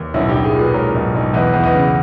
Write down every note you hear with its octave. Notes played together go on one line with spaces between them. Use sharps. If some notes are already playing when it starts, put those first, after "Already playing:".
Already playing: D#2
B1 C#4 E4
B1 D#4 G4
E4 G#4
A#2 G#4 B4
G#3 A#4 C#5
B1
B1
E2 B4 D#5
E2
B4 D#5
C#3